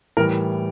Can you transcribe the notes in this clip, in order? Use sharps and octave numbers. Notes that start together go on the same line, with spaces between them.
A2 E3 G3 A#4